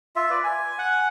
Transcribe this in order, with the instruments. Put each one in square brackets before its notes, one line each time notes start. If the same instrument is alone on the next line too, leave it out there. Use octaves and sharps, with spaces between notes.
[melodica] F4 E5
B4 D5
G#5
[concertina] F#5